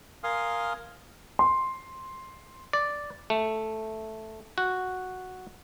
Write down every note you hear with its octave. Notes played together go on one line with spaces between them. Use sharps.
A#4 F5 G#5 C6 D#6 F6
C6
D5
A3
F#4